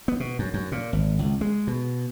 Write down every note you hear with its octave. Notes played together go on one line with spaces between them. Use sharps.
B3
B2
F#2
F#2
A#2
G#1
C#2
G#3
B2